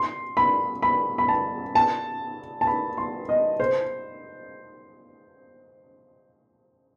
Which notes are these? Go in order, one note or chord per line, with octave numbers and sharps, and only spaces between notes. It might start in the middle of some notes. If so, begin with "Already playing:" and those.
Already playing: C6
B5
B5
B5
A5
A5
A5
B5
C6
D#5
C5